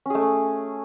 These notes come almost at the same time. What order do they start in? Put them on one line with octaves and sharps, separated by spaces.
C#4 G#4 A3